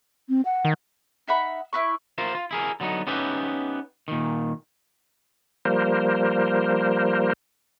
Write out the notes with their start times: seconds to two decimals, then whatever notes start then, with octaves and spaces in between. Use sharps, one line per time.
0.29 C4
0.45 F#5
0.65 D#3
1.28 D#4 E5 F#5 B5
1.73 E4 B4 C#6
2.18 F4 A#4 C5 E5
2.35 F4
2.51 E4 G#4 A#4
2.80 D3 F#3 B3 D#4
3.07 B3 C#4 D#4 G4 B4 E5
4.08 A#2 D#3
5.65 F3 G3 A#3 A#4 C5